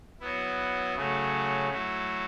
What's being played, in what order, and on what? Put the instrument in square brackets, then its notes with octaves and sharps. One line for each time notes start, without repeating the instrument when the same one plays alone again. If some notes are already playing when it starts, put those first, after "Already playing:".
[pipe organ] F#3 B3 E4
C#3 F#3 A3
F#3 A3 E4